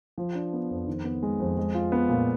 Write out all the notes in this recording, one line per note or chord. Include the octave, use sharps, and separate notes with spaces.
F3
D4
B3
F2
D#3
B3
G#3
F2
G#3
F4
B3
A#2